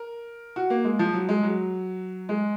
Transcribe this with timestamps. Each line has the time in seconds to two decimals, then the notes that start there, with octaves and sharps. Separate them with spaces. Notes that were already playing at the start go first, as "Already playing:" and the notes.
Already playing: A#4
0.56 F#4
0.70 A#3
0.84 G#3
0.99 F3
1.13 F#3
1.29 G#3
1.43 F#3
2.29 G#3